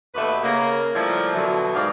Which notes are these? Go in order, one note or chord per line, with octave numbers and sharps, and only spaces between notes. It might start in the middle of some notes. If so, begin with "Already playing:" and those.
D#2 B2 A3 B4
C#3 A#3
F3 G3 A3 A#3 E4
B2 D3 E3 F#3
G#2 G4 D5 F5